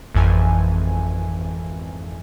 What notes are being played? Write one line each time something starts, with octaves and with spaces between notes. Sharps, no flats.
G#1 F2 E3 G#5